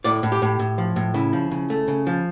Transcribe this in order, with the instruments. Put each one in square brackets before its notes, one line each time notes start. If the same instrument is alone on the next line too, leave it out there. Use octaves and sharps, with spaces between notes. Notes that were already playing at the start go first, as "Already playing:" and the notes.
[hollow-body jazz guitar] A2 D5
A2
G4
A2
A2
F3
A2
C#3 E4
F3
C#3
A3
C#3
F3